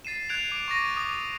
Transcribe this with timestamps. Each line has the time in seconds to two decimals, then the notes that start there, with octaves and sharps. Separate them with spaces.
0.05 A6 C7 D#7 E7
0.29 F#6 G#6 C7 D7 F7
0.52 D6 D7
0.68 C#6 D6 A#6 D#7
0.96 D6 D#6 A#6